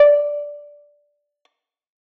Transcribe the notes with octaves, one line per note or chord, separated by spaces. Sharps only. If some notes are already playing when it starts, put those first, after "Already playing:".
Already playing: D5